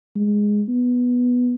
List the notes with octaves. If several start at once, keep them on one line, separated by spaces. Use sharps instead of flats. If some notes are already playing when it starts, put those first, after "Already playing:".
G#3
B3